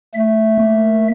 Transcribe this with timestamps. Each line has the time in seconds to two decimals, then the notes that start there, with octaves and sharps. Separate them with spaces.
0.15 A3 E5
0.58 A#3